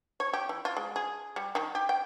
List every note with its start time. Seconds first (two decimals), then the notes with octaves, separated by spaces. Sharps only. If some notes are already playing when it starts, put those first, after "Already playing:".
0.20 C#5
0.33 G4
0.49 E3
0.65 F4
0.77 G#3
0.96 G#4
1.36 G3
1.55 D#3
1.75 G4
1.89 G5